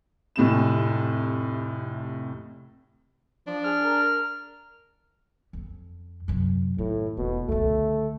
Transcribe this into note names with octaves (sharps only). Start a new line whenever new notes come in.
F1 A2 C3 E7
F3 D4
G#4 F6
A#4
F2
F#2 C3
A2 D#3
E1 B2
C#2 D3 A3